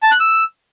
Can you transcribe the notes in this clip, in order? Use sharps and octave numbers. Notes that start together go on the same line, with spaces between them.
A5
F#6
E6